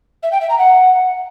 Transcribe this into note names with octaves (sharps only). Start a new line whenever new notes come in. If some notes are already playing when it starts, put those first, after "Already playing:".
E5
G5
E5
A#5
F#5